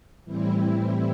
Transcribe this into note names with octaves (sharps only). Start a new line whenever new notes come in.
A2 E3 G3 C4 E4